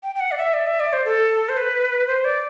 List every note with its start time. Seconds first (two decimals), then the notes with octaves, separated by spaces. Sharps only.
0.03 G5
0.15 G5
0.20 F#5
0.31 D5
0.38 E5
0.54 D5
0.67 E5
0.80 D5
0.93 C5
1.05 A4
1.49 C5
1.57 B4
2.08 C5
2.25 D5